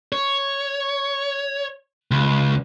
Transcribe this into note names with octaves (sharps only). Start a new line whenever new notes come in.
C#5
C#2